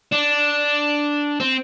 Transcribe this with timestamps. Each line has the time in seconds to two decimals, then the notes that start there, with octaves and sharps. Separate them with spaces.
0.13 D4
1.40 C4